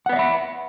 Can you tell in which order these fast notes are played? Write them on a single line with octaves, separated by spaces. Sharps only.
F#5 B4 D5 E5 B5